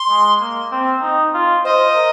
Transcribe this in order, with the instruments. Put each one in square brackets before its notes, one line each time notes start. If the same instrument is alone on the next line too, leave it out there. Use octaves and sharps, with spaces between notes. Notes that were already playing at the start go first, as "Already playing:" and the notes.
Already playing: [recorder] C6
[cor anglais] G#3
A#3
C4
D#4
F4
[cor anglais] C5 [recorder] D#5
[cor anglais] A#4